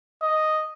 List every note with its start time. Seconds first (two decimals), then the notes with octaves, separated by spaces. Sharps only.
0.22 D#5